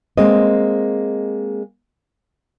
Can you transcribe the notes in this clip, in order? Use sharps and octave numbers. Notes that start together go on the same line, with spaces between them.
G#3 A#3 C4 D#5